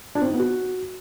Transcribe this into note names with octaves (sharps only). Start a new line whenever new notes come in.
D4
C4
D#4
B3
F#4